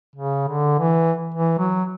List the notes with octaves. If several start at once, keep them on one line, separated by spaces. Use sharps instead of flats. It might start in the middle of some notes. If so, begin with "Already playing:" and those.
C#3
D3
E3
E3
F#3